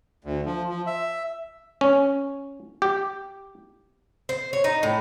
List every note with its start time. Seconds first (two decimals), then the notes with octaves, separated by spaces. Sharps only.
0.24 D2
0.46 F3
0.69 F3
0.87 E5
1.81 C#4
2.82 G4
4.29 C5
4.53 C#5
4.64 D#4
4.83 A2